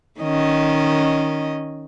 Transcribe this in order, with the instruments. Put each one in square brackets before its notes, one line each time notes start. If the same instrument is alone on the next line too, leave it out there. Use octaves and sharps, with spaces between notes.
[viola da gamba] D#3 C#4 D#5